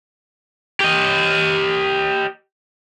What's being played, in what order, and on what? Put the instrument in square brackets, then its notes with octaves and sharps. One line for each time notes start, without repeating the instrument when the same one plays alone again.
[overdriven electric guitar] G4 D#5